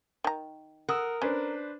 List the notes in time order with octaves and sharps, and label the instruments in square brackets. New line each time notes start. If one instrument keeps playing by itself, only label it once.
[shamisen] D#3 A#5
[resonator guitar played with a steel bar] A#4 [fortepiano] F#5 D#6 E6
[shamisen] C#4 [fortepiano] D4 B4 C5